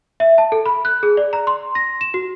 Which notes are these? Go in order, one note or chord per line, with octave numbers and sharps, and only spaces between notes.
E5
A5
A4
B5
F#6
G#4
D5
A#5
C6
A#6
E7
F#4